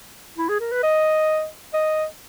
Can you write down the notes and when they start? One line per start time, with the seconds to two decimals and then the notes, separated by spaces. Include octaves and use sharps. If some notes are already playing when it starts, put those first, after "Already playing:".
0.38 E4
0.49 G#4
0.60 A#4
0.71 B4
0.83 D#5
1.73 D#5